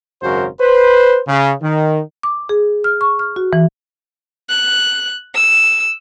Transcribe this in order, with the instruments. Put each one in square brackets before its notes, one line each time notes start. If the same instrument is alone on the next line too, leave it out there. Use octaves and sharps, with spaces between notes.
[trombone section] G#1 F#2 C#3 F#4 A#4 C5
B4 C5
C#3
D#3
[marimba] D6
G#4
F6
C#6
F6
F#4
E3
[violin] F#6
E6